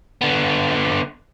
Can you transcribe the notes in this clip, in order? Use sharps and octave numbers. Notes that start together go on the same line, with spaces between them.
D3 B3